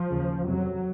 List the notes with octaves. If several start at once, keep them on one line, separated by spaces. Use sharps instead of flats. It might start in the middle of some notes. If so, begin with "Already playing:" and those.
Already playing: F3
D#2 C#3
F2 C3 F#3